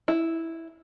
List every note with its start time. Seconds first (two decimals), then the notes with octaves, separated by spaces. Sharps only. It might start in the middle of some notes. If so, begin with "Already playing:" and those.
0.08 E4